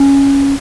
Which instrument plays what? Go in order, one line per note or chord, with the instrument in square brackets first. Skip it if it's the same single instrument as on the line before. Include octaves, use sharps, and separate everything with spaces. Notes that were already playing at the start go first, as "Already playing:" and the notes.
Already playing: [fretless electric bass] C#4